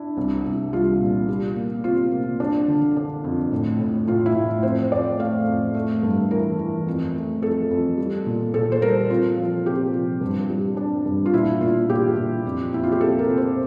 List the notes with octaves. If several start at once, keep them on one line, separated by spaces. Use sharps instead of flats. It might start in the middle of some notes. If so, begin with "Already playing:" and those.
Already playing: D4 E4
C2
C2
G3 F4
A#2
G3
A#3
C3 F4
A#3
D4
D3
D4
F2
A2
A2
A2 F4
E4
A2
F2 C5
F2 D5
A3 F5
F2
A3
G2
E3 A#4
E3
F2
A3
F2 A4
F2
G3
A#2
A#2 A4
C5
G3 A#4
C4 F4
F3
C3 G4
F3
G2
G3
D4
G2
F4
A#2 E4
A#2 F4
A#2 G4
A#2
F2
F2 E4
F4
G4
C3 A4
A#4
C3
C5